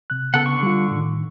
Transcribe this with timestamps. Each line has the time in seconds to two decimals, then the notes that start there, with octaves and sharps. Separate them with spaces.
0.10 C3 F#6
0.34 C#3 B3 A4 F#5
0.45 D3 C#6
0.63 G3 F4
0.91 A2 D#3